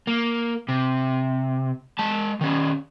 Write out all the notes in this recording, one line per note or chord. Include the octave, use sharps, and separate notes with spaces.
A#3
C3
G#3 A5
D#3 C#4